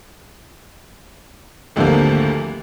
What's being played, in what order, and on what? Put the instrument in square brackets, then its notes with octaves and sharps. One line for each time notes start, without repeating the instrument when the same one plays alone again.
[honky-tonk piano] G#1 D2 D3 F3 A#3 G4